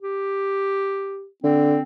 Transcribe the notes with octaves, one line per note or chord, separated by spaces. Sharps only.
G4
D3 C4